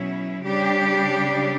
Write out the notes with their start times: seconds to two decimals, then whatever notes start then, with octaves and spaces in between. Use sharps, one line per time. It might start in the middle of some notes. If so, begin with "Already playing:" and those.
Already playing: B2 F#3 C#4 E4
0.44 C#3 G3 D4 G4